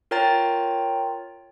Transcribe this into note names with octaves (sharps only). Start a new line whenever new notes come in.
F4 A#4 C#5 G5 A#5 A6